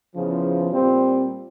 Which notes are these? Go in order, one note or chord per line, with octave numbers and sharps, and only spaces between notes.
E2 C#3 F3
A#2 G3 C4